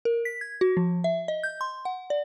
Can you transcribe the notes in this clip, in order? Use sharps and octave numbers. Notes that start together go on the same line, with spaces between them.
A#4
B6
G#6
F#4
F3
E5
D#5
G6
C6
F#5
D5